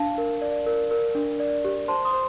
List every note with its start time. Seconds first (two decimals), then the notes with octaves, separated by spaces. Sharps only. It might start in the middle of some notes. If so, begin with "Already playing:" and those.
Already playing: D4 F5 A5
0.18 A#4
0.42 D5
0.67 A#4
0.91 A#4
1.15 D4
1.40 D5
1.65 G4
1.88 C5 A5 C6
2.05 C6 D#6
2.13 C5